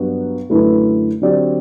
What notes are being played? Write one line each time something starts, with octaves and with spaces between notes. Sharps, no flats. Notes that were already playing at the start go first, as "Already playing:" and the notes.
Already playing: G2 F#3 B3 F#4
F#2 D3 A3 E4 B4
D3 F#3 C4 G4 D5